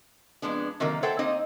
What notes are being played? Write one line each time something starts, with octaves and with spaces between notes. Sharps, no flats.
F2 C#3 G#3 B3 D4
C3 D#3 F#3 A#3
A4 C5 C#5 E5 F#5 G5
A#3 C4 D#4 C5 D#5